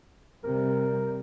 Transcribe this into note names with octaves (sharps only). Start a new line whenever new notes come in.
C3 G3 A#4